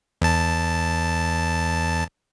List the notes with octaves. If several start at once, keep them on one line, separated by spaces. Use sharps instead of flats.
E2 A5